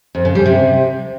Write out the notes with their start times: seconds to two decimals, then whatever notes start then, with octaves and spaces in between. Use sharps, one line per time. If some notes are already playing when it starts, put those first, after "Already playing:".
0.15 F2
0.25 C#3
0.35 G3
0.46 C3